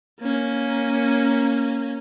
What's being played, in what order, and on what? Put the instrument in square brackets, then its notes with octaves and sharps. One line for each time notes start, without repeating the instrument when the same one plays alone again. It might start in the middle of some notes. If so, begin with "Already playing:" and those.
[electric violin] A#3 C#4